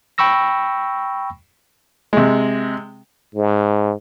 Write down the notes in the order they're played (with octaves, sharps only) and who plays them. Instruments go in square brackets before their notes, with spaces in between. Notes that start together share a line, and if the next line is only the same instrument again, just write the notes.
[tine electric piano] G5 B5 C#6 E6 A#6
[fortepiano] C3 G#3
[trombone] G#2